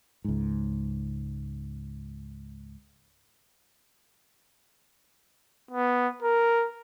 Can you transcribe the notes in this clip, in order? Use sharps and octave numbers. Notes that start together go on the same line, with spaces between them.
C#2 G#2
B3
A#4